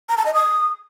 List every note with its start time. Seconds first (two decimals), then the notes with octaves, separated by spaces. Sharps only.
0.09 A#5
0.17 A5
0.26 D#5
0.34 D#6